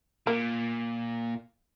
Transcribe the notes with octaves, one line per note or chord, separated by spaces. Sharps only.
A#2 A#3